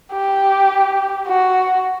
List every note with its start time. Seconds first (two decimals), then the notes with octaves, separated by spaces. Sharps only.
0.13 G4
1.27 F#4